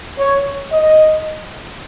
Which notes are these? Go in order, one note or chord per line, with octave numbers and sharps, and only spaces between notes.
C#5
D#5